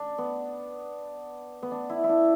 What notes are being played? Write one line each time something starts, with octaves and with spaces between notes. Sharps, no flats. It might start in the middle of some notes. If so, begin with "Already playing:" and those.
Already playing: D4
B3
B3
D4
E4
E4
D4